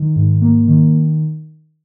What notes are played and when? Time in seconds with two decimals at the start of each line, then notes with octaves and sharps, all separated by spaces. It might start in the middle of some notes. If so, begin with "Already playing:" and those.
Already playing: D#3
0.16 G#2
0.41 A#3
0.67 D#3